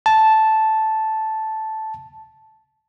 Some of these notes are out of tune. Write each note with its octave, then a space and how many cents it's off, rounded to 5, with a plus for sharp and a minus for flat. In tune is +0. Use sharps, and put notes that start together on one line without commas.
A5 -5